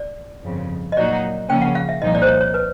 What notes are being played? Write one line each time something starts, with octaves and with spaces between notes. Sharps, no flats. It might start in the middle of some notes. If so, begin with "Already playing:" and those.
Already playing: D5
G1 F2 C#3 F3
D#5
A#2 F#3 A#3 D#4 F#4 D5
C#3 F3 A#3 C#4 G5
F#5
F5
E5
C2 A#2 F3 A#3 D#4 D#5
D5
C5
C#5
C#5
B4